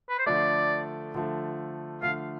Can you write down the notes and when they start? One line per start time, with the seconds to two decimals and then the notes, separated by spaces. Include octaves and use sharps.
0.10 B4
0.19 C5
0.26 D3 F3 A3 D5
1.14 D3 F3 A3
2.02 D3 F3 A3 F5